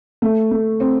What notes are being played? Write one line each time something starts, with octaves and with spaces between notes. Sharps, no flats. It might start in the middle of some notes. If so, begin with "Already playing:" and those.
A3
A3
C4